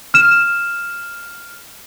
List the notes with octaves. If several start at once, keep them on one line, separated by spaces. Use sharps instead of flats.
F6 E7